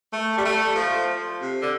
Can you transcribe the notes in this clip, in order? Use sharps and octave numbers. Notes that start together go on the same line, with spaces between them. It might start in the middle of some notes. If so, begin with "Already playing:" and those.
A3
G3
A3
F3
C3
D3